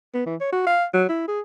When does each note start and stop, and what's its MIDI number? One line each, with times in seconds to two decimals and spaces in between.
0.14 0.26 59
0.26 0.36 52
0.41 0.51 73
0.53 0.64 66
0.67 0.85 77
0.93 1.05 54
1.09 1.24 64
1.28 1.40 68